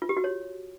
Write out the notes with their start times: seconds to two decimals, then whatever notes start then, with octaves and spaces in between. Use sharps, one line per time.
0.02 F4
0.09 G4
0.17 F#4
0.24 C#5